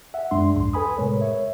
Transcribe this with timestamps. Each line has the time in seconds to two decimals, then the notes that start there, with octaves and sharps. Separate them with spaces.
0.14 E5 F#5
0.31 F#2 G#3 D4 C6
0.55 C2 F2 G#2 C6
0.73 A4 B4 G#5 B5 D#6
0.98 A2 C3 G#3 A#4 B4 C#5
1.21 C#5 E5